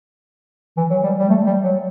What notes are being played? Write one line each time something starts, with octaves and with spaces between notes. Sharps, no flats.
E3
F#3
G3
G3
A3
G3
F#3